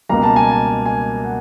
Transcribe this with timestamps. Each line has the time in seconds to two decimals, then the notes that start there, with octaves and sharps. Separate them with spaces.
0.09 C#2 B2 G3 A#3 A#5
0.23 A5
0.36 G#5
0.50 A5
0.86 G#5
1.24 F#5